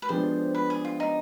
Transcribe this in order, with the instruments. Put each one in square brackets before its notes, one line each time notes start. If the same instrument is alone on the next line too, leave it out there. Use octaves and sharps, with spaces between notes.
[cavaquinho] B4
[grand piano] F3 G#3 B3 D4 G4 [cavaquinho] C5
[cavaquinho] B4
G#4
F4
D#4